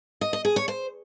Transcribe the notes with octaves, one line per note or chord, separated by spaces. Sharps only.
D#5
D#5
G#4
C#5
C5